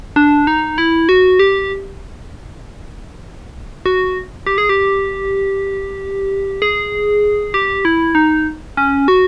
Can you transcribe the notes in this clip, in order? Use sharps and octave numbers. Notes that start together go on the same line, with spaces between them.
D4
D#4
E4
F#4
G4
F#4
G4
G#4
G4
G#4
G4
E4
D#4
C#4
F#4